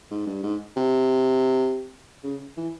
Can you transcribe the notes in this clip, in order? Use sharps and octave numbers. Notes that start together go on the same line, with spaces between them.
G#2
G2
G#2
C3
C#3
E3